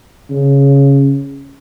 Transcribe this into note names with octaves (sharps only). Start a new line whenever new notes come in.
C#3